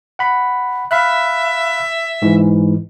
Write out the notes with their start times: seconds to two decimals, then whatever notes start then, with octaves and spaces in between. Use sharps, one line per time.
0.19 F#5 B5
0.91 E5 F5 B5 F#6
2.22 G#2 E3 G#3